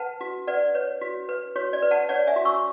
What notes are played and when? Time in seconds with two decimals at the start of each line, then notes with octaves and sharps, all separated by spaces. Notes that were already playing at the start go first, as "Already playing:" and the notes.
Already playing: B4 F#5 A5
0.21 F#4
0.47 B4 D5 F#5
0.75 B4 C#5
1.01 F#4
1.29 B4
1.56 F#4 C#5
1.73 D5
1.82 B4
1.91 F#5 A5
2.09 C#5 D5 F#5
2.27 E5 G#5
2.36 F#4
2.45 C#6 E6